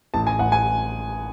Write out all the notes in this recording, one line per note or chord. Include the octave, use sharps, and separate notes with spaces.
A1 A5
G#5
A1 F#5
G#5